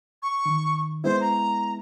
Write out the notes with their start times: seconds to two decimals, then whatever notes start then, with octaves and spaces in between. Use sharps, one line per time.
0.23 C#6
0.46 D#3
1.04 G#3 B3 E4 C5
1.21 A#5